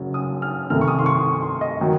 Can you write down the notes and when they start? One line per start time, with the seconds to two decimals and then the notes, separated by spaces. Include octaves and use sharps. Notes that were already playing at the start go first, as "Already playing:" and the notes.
Already playing: F#1 F#2 C#3 F#3
0.14 D#6
0.42 F6
0.70 C2 C3 D#3 A3 C4 F6
0.81 C#6
0.88 D#6
0.99 C6
1.06 C#6
1.42 C6
1.61 D#5
1.81 D#3 F#3